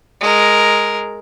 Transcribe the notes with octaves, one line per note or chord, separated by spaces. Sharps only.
G#3 A#4